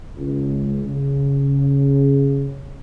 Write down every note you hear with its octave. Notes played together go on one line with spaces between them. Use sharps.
C#2
C#3